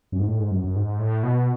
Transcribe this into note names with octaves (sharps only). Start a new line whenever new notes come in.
F#2
G#2
A2
G#2
F#2
F#2
G#2
A2
B2